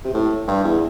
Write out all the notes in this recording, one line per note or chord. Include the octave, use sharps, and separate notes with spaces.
C3
A2
G2
E2